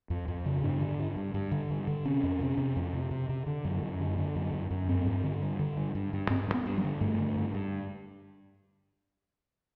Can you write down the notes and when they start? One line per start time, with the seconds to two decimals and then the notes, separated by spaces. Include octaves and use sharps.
0.10 F2
0.28 F2
0.46 C#3
0.63 G2 D4
0.81 D3
0.99 G2
1.16 G2
1.34 G2
1.52 D3
1.70 G2
1.87 D3
2.05 C3 C#4
2.23 F2
2.41 C3
2.58 C3
2.76 F2
2.93 C3
3.11 C3
3.29 C3
3.46 D3
3.65 F#2
3.82 F#2
4.00 D3
4.18 D3
4.36 F#2
4.53 F#2
4.70 F#2
4.88 G2 C4
5.07 G2
5.24 D3
5.42 G2
5.59 D3
5.77 G2
5.95 G2
6.13 G2
6.30 G2 C4
6.48 G2
6.54 B3
6.66 G2
6.78 F#3
6.84 D3
7.01 G2 A3
7.19 D3
7.36 G2
7.54 G2